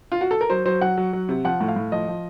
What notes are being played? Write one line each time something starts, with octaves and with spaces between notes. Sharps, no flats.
F4
F#4
A4
A#4
F#3 C5
F#3 C5
F#3 F#5
F#3
F#3
C3
F3 F#5
A2
F5
A2
F3 D#5
F3